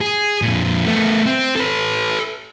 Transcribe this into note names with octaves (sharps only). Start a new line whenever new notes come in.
G#4
F2 A#2
A3 B3
C4
A4 B4